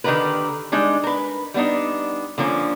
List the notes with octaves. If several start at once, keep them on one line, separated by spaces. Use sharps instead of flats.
D3 D#3 D#4 G4 A#4 B4
G3 G#3 D4 D#4
A#4 B4
G3 B3 D4 D#4
D3 F3 A#3 C#4